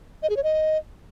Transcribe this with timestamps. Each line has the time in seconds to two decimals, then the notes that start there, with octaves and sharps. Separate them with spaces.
0.23 D#5
0.30 G#4
0.37 C#5
0.44 D#5